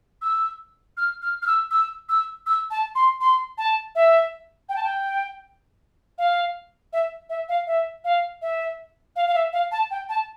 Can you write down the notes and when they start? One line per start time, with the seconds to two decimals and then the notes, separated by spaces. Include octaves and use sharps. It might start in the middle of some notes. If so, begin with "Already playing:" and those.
0.22 E6
0.97 F6
1.22 F6
1.42 F6
1.47 E6
1.71 E6
2.09 E6
2.46 E6
2.70 A5
2.95 C6
3.21 C6
3.58 A5
3.95 E5
4.69 G5
4.76 A5
4.83 G5
6.18 F5
6.93 E5
7.29 E5
7.49 F5
7.67 E5
8.04 F5
8.42 E5
9.16 F5
9.27 F5
9.34 E5
9.53 F5
9.72 A5
9.91 G5
10.09 A5